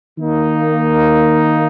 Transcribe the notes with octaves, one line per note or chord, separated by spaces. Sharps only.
D#3 A#3 D#4